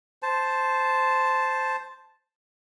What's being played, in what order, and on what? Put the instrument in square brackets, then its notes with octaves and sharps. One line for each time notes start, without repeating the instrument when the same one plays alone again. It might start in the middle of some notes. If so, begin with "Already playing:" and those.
[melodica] C5 A5